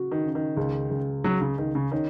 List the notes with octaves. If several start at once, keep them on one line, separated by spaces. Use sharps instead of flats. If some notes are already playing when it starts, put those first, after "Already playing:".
Already playing: C#3 F#4
D#3
C#3
D#3
C#2
C#2
C#2 F#3
C#3
C#2 D#3
C#3
D#3 C#4